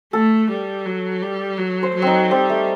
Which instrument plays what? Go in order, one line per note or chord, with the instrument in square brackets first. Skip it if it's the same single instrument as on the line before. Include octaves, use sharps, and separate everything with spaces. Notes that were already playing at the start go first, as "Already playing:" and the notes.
[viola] A3 [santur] A4
[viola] G3
F#3
G3
F#3
[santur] C5
[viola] F#3
[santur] C4 D#4
[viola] G3 [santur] C4
[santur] A3